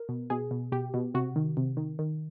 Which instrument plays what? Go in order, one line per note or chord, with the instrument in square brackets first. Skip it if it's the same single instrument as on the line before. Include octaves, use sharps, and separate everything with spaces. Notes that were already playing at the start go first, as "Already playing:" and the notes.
Already playing: [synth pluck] A#4
B2
B2 G#4
B2
B2 G4
B2
C3 F#4
D#3
C3
D#3
D#3